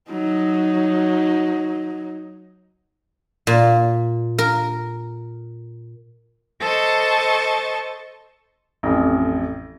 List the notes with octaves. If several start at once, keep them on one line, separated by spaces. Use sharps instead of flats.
F#3 D#4
A#2
A#4
A4 C5 D#5 A5 C#6
A1 F2